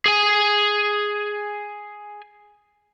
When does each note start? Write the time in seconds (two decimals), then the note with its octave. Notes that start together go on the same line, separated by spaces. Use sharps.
0.06 G#4 G#5